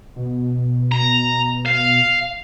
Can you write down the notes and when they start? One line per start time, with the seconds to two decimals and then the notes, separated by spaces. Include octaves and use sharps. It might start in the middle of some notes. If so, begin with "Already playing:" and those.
0.16 B2
0.92 A#5
1.66 F5